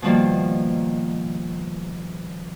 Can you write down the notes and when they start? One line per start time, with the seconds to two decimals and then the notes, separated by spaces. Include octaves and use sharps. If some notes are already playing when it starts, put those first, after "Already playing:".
0.02 B2 D#3 F3 G3 A#3